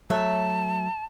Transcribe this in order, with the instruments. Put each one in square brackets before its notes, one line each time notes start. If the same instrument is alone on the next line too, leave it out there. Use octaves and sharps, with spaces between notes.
[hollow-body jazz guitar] F#3 A3 C#5 [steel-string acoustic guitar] E5 [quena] A5